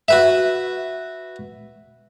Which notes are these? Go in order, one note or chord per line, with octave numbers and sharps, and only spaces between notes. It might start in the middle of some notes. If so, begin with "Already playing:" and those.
F#4 B4 E5